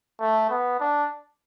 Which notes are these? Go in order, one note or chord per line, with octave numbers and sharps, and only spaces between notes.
A3
B3
D4